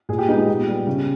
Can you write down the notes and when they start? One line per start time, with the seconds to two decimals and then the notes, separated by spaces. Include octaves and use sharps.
0.09 A#2 G#4
0.18 G4
0.28 G#3 B3 D#4
0.38 G4
0.48 A#2
0.67 G3 B3
0.87 C#3